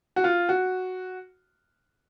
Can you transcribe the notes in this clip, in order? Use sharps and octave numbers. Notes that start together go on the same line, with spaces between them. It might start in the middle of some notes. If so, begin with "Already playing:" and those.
F#4
F4
F#4